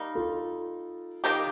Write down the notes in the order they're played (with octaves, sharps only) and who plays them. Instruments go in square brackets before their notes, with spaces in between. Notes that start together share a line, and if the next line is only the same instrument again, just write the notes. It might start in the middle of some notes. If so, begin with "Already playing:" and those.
Already playing: [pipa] G3 A#3 D#4
[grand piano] F4 A4
[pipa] D#3 A#3 D#4 G4